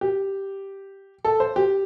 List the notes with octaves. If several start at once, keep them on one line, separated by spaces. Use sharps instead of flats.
G4
A4
C5
G4